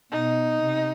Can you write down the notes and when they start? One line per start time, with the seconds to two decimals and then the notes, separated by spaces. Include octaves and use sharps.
0.12 B2 D#4
0.63 C3